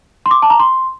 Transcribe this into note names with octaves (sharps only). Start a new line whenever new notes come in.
C6
D6
A5
A#5
C6